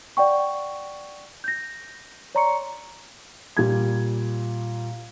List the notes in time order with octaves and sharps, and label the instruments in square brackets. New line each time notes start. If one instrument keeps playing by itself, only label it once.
[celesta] D5 F#5 G5 C#6
G6 A#6
C#5 D5 A#5 C6 C#6 C#7
[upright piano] A#2 G3 G#6